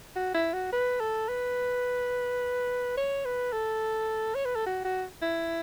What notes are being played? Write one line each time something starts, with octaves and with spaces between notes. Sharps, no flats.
F#4
E4
F#4
B4
A4
B4
C#5
B4
A4
C#5
B4
A4
F#4
F#4
E4